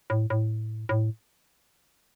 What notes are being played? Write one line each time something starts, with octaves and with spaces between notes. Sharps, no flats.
A2
A2
A2